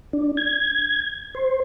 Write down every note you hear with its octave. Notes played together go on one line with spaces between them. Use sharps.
D4
G#6
C5